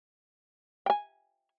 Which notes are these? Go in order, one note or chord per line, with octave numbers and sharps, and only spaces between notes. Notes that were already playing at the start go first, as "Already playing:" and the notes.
G5 G#5